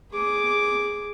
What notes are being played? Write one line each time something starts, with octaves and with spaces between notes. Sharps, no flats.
G#4 D6